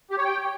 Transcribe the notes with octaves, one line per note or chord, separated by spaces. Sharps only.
G4
C#5
G5